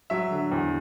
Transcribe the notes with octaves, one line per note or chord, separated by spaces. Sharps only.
F#3 E5
D3
E2